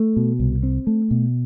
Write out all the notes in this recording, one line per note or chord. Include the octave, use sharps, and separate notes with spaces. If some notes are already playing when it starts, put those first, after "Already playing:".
Already playing: A3
B2
C2
C4
A3
B2